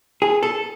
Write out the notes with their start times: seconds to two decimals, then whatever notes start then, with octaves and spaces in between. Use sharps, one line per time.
0.22 G#4
0.43 A4